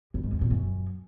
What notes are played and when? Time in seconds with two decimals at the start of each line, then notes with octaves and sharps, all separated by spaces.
0.14 G2
0.23 G#2
0.32 E2
0.41 A#2
0.50 F#2